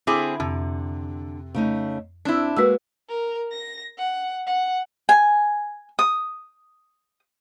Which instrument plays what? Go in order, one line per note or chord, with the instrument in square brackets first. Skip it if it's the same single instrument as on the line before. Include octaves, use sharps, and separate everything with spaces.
[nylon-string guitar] D3 [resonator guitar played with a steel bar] C4 E4 G#4 [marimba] D6
[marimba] F2 [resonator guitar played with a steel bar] C3
[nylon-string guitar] C#3 A3 D#4
[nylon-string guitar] C4 [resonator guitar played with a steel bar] D4 E4
[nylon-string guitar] G#3 A#3 F#4 [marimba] B4 E6
[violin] A#4
A#6
F#5
F#5
[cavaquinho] G#5
D#6